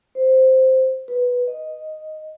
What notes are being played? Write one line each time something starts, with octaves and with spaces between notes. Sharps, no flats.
C5
B4
D#5